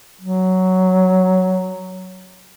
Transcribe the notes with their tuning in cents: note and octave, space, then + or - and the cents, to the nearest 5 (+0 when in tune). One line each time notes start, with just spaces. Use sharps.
F#3 +5